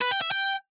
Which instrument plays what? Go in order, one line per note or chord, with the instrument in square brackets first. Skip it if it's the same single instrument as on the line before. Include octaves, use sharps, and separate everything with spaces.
[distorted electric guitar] B4
G5
E5
G5